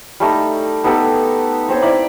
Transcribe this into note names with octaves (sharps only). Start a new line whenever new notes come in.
G3 A3 D#4
B3 D#4 G4 A4
C4 C5 C#5
E4 D5 A#5 B5